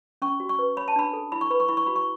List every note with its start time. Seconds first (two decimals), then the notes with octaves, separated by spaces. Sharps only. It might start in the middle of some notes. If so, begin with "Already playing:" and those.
0.22 C#4 C#6
0.40 F#4
0.49 C#6
0.59 B4
0.77 C#5 B5
0.88 A5
0.96 D4 B5
1.13 A4
1.32 E4 B5
1.41 C#6
1.51 B4 B5
1.60 C#6
1.68 E4 B5
1.77 C#6
1.86 F#4 B5
1.96 C#6